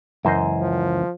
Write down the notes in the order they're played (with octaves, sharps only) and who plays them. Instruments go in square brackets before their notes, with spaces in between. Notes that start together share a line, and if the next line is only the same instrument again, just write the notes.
[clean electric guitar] C#2 E3 [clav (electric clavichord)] F#2 C5 D#5
[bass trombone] F3